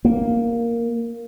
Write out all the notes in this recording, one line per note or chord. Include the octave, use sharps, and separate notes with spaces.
A#3